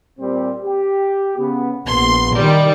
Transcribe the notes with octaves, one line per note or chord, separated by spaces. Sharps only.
A#2 G3 C4
G4
C#3 B3
A#1 B3 C6
D#3 G3